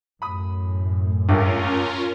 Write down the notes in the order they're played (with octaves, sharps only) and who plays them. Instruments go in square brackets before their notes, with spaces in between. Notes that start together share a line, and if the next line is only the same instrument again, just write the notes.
[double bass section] F#2 A2 [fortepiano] B5 D#6
[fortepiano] C#2 A3 G4 [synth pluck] G2 [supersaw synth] C#4 F4 A#4